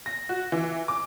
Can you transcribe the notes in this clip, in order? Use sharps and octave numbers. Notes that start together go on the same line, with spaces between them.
A#6
F#4
E3
D6